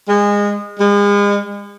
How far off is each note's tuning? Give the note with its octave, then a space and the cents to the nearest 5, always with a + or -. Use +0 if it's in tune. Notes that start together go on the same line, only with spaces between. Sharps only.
G#3 -25
G#3 -40